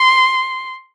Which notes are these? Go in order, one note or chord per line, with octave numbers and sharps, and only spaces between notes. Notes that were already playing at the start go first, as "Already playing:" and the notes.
Already playing: C6